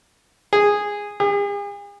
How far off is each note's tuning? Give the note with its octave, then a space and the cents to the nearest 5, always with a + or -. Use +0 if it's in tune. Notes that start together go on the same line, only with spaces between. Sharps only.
G#4 -10
G#4 -45